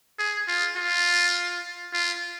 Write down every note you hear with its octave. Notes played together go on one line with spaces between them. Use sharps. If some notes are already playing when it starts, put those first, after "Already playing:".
G#4
F4
F4
F4